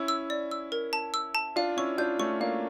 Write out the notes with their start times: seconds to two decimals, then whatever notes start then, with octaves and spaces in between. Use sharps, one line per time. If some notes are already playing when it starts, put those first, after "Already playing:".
Already playing: C#4 E4
0.08 E6
0.30 D5
0.51 E6
0.72 A#4
0.93 A5
1.14 E6
1.35 A5
1.56 D4 F4 F5
1.77 C#4 E4 C#6
1.98 D4 F4 G6
2.19 A3 C#4 C#6
2.40 A#3 D4 F5